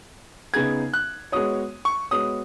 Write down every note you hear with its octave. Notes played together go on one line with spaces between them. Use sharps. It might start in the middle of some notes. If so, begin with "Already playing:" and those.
C#3 B3 D#4 G#4 G#6
F#6
G#3 B3 F#4 C#5 D#6
C#6
G#3 B3 F#4 C#5 D#6